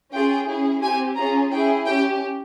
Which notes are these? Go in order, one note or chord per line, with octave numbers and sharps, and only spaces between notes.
C#4 F4 G#4 G5
C#4 E4 G#4
C4 G4 G#5
C#4 F4 G#4 A#5
C#4 E4 G#4 G5
C#4 G4 G5